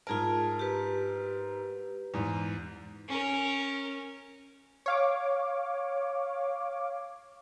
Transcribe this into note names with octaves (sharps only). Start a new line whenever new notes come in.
G#2 F4 G#4 A#4 A5
G4 B4
E2 G#2
C#4 A#4
C#5 F5 D6